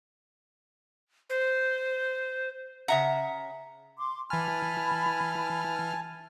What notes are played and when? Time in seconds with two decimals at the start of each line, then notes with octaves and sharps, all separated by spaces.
1.30 C5
2.88 C#3 E5 F#5 A#5
3.97 C6 D6
4.30 E3 G#5 A5 B5 F6